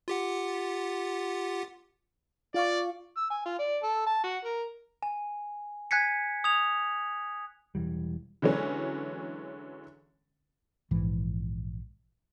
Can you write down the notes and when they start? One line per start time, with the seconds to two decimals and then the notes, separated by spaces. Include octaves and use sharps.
0.08 F4 G4 F#5
2.54 F4 D5 F5 C#6
3.17 E6
3.30 G#5
3.45 F4
3.59 D5
3.83 A4
4.06 A5
4.23 F#4
4.44 A#4
5.03 G#5
5.91 G#5 F#6 G#6 B6 C#7
6.44 D#6 G#6 F7
7.75 E1 E3 G3
8.42 D3 E3 F#3 G#3 C#4
10.91 A#1 G#2 E3 F3